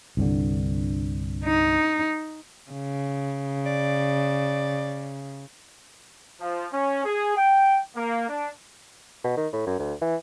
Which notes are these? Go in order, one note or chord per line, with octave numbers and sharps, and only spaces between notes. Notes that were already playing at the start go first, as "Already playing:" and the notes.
C2 G2 D3
D#4
C#3
D5
F3
C#4
G#4
G5
A#3
D4
B2
D#3
A2
F#2
D2
E3